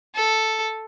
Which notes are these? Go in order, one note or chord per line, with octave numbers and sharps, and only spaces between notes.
A4